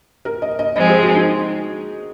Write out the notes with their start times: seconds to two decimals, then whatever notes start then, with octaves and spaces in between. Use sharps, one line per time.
0.25 A#4
0.42 D#5
0.59 D#5
0.76 F3 G#3 C4 D#5
0.89 G#4
1.02 F#4
1.15 D#4